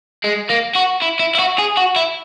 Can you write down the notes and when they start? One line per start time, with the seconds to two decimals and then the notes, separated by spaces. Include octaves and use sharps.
0.24 G#3
0.49 A#3
0.75 F#4
1.02 E4
1.19 E4
1.35 E4
1.39 F#4
1.59 G#4
1.77 F#4
1.96 E4